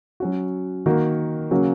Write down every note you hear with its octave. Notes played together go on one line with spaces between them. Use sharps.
F#3 C#4 F#4
D#3 A#3 F#4
C#3 F#3 A#3 C#4 F#4